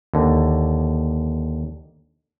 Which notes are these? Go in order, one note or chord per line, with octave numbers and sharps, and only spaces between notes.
D#2 D3